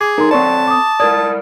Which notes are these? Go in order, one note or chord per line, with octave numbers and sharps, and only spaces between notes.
G#4 D6
D#4 A4 A#4 C6
C4 A4 C#5 D5 A5 C6 C#6
D6 D#6
E4 A#4 D5 D#6 G#6 A6